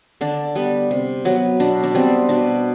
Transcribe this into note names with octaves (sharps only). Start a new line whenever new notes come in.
D3 D4
G3 B3
C3
F#3 B3
B2 D4
D4
G3 B3 C4
B2 D4